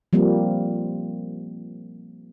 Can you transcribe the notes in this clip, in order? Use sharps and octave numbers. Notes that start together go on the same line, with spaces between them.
F3 G3 A#3 C4